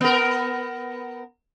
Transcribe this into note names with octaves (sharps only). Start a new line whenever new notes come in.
B3 A#4